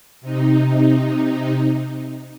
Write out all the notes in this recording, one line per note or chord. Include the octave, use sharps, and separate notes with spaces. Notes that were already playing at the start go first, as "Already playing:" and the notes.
C3 D#4